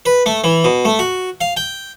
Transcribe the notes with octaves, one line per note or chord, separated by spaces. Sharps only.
B4
A3
E3
B2
A3
F#4
F5
G5